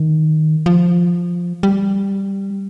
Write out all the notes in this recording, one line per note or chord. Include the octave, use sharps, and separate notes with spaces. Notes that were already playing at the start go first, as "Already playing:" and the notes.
Already playing: D#3
F3
G3